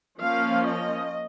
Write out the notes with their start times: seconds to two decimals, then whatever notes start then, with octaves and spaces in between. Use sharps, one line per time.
0.19 F3 A#3 C#4 F5
0.68 D#5